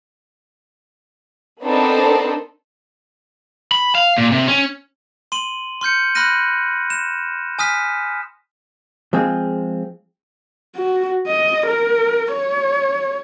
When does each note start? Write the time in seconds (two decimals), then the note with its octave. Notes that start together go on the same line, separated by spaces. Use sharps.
1.63 B3 C4 D4 D#4 A4 A#4
3.72 B5
3.95 F5
4.18 A#2
4.32 C3
4.48 C#4
5.32 C6 D#7 F#7
5.81 C6 F6 G6 C#7
6.15 B5 C6 F6 F#6 A#6 D#7
6.90 E7
7.59 G#5 D#6 F6 B6
9.13 F3 G#3 C4 G#4
10.75 F#4
11.27 D#5
11.67 A#4
12.32 C#5